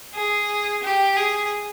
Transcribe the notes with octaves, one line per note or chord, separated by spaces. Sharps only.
G#4
G4
G#4